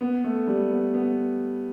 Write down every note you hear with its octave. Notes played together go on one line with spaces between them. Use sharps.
B3
A3
G3
B3
B3